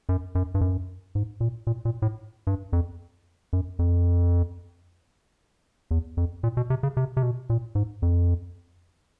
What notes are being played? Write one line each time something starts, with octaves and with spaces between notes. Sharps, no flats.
F#2
F#2
G2
F#2
G#2
A#2
A#2
A#2
A2
G2
F2
F#2
F2
E2
F2
A#2
B2
C3
C#3
C3
C3
B2
A#2
G#2
F2